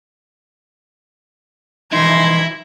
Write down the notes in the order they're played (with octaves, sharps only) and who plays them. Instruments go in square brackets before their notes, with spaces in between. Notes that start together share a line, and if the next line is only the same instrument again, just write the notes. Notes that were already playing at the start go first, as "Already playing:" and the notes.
[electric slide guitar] E3 F3 D#4 [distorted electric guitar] E4 [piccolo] C6 [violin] G#6 A#6